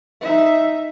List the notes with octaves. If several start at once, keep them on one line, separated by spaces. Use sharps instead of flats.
D#4 E5